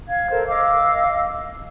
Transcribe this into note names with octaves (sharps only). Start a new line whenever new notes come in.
F5 G#6
A4 A#4 C5
D#5 F5 D6 E6